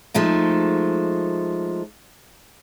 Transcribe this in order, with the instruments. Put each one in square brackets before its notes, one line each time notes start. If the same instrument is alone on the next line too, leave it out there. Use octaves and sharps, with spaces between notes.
[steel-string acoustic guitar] F3 G#3 A3 D#4